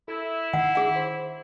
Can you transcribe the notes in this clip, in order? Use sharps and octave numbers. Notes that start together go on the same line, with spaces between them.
E4 A4
D#3 F#5 E6 C7
G#4 F#5
C5